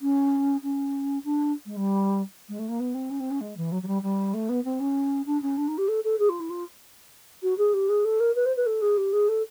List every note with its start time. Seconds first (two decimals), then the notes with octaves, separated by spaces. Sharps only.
0.01 C#4
0.63 C#4
1.25 D4
1.66 G#3
1.77 G3
2.49 G#3
2.59 A3
2.69 A#3
2.80 B3
2.95 C4
3.11 C#4
3.20 C4
3.31 C#4
3.41 G#3
3.57 E3
3.72 F#3
3.83 F#3
3.87 G3
4.03 G3
4.34 A3
4.49 B3
4.65 C4
4.80 C#4
5.26 D4
5.42 C#4
5.58 D4
5.68 D#4
5.78 G4
5.88 A4
6.04 A4
6.19 G#4
6.29 F4
6.40 E4
6.50 F4
7.43 F#4
7.58 G#4
7.73 G4
7.89 G#4
8.05 A4
8.20 A#4
8.35 B4
8.46 C5
8.57 B4
8.66 A4
8.82 G#4
8.97 G4
9.13 G#4
9.29 A4